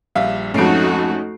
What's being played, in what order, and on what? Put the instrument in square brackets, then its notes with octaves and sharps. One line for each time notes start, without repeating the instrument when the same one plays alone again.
[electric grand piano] A#1 G3 E5 [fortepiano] F5
[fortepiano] F2 G#2 [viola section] A3 D#4 F#4 [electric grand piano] C#4 C7 D7